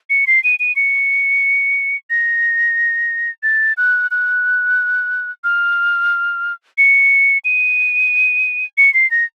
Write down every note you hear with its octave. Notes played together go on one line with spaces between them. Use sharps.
C#7
C7
D#7
D#7
C#7
A#6
A6
F#6
F#6
F6
C#7
D#7
C#7
C7
A#6